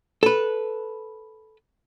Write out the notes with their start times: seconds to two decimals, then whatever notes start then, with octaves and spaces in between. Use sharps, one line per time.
0.23 A4 B4